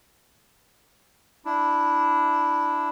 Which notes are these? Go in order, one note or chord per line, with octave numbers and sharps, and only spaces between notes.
D4 E4